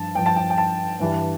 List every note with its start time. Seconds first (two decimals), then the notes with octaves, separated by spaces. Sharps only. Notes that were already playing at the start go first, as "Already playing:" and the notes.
Already playing: G2 F3 A5
0.15 G2 F3 G5
0.26 A5
0.36 G5
0.50 G5
0.58 A5
1.00 G2 E3 G3